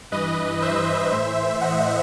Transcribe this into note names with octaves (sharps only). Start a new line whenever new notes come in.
G2 E3 B4 D#5
C5 E5
A2 E3
D#5 F#5